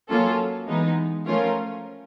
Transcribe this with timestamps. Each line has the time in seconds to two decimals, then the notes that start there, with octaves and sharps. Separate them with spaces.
0.09 F#3 A#3 C#4 F4 A4
0.67 E3 G#3 B3 D#4
1.26 F3 A3 C#4 F4 A#4